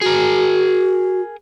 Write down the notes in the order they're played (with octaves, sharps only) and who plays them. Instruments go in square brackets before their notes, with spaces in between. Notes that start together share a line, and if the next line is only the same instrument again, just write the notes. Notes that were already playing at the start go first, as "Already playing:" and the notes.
[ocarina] F#4 [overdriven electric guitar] G#4 A#4